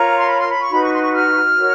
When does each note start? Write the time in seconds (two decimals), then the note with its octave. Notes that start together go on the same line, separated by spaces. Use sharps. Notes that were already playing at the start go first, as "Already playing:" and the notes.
Already playing: F4 A#4 C#5 A#5
0.18 C6
0.26 B5
0.37 C6
0.48 B5
0.59 C#6
0.69 D#4 F#4 B4 B5
0.81 C#6
0.92 C6
1.02 C#6
1.14 F6
1.58 F#4 A#4 C#5